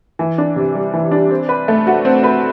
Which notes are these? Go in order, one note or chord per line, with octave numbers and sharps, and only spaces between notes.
E3
D4
C3
G3
E3
D4
C4
B4
A3
F#4
C4
B4